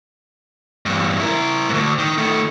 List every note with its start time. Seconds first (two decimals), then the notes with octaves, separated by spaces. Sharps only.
0.86 E2 G2
1.20 E4 A#4
1.69 D2 G#2
1.98 D#3
2.18 D#3 A3